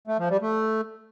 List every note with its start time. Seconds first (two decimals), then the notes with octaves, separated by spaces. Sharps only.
0.07 A3
0.19 F3
0.30 G3
0.42 A3